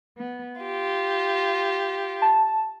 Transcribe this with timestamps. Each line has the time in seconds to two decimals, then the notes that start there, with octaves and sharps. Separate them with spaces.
0.16 B3
0.62 F4 G4
2.22 A5